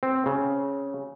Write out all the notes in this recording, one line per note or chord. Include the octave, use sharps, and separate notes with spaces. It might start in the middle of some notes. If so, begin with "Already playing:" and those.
C4
C#3